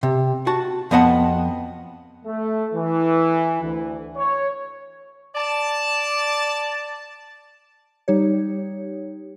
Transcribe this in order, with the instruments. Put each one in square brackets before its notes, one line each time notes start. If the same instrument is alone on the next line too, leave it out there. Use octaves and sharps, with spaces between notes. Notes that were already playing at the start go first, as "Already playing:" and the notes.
[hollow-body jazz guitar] C3
F#4 A5
F2 B3 D#5 F#5 A5
[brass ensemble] A3
E3
D2
C#5
[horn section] D5 A5
[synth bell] G3 D#4 G4 C#5